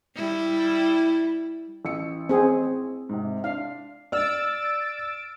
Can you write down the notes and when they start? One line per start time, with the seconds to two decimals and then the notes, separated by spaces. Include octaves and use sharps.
0.16 G3 E4
1.85 A1 E6 C#7
2.29 C4 G#4
3.09 G#2 C3
3.44 D4 F5
4.12 D5 E6 F6 A6 D7